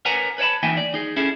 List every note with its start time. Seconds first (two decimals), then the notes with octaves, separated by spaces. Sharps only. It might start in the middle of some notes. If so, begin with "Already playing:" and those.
0.05 A#4 B4 C#5 F#5 G#5 A#5
0.38 B4 C#5 D5 A5 B5
0.63 E3 A#3 D#4 E5 G5 G#5
0.77 D5
0.94 D#4 G#4
1.16 C#4 E4 G#4 A4